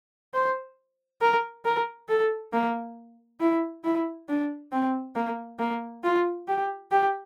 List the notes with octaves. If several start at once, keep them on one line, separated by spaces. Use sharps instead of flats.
C5
A#4
A#4
A4
A#3
E4
E4
D4
C4
A#3
A#3
F4
G4
G4